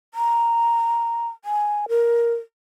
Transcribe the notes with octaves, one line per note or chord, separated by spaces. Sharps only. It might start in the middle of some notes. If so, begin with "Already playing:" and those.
A#5
G#5
A#4